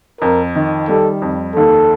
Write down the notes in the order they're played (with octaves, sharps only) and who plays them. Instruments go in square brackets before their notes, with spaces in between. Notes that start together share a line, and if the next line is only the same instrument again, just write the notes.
[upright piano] F2 [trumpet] A#4
[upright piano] D#3
[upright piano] G3 [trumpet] A4
[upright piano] F2
[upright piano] D#2 [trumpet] A4